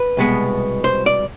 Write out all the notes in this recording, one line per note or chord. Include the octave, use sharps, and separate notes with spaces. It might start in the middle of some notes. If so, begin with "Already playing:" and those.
Already playing: B4
C2 B2 G#3 B3
C5
D5